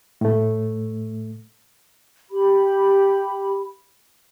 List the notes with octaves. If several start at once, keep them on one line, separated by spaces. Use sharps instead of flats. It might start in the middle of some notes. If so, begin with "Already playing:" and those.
A2 A3
G4 B5